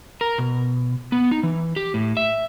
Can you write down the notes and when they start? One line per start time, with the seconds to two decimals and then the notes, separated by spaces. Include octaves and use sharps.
0.21 A#4
0.38 B2
1.12 B3
1.31 D#4
1.43 E3
1.76 G4
1.94 A2
2.17 E5